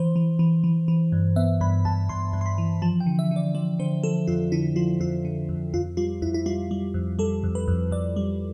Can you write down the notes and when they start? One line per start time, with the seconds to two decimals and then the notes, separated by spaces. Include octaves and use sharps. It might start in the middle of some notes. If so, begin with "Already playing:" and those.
Already playing: E3 C5
0.16 E3
0.39 E3
0.64 E3
0.88 E3
1.12 G2
1.36 B3 E5
1.61 G2 B5
1.85 G2 A5
2.09 G2 C6
2.33 G2
2.41 C6
2.46 B5
2.58 E3
2.82 F3 A5
3.00 G5
3.06 D3
3.19 E5
3.31 D3 D5
3.55 F3 D5
3.79 D3 C5
4.03 F3 A4
4.27 F2 F4
4.52 D3 E4
4.76 F3 F4
5.00 F2 F4
5.25 D3
5.49 F2
5.73 F2 F4
5.97 G3 F4
6.22 F2 E4
6.34 E4
6.46 G3 F4
6.71 G3
6.94 F2
7.19 G3 A4
7.44 F2
7.55 B4
7.68 F2
7.91 F2 D5
8.16 G3